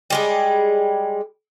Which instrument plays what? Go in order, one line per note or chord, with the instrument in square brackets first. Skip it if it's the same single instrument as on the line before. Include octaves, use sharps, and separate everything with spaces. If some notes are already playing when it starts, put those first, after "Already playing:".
[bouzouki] G3 G#3 G#4